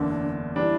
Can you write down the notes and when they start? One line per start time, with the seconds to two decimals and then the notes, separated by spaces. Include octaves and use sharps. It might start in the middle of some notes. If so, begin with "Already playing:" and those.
Already playing: F#1 E2 D3 D4
0.56 E3 G3 D4 E4